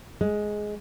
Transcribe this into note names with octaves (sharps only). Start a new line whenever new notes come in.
G#3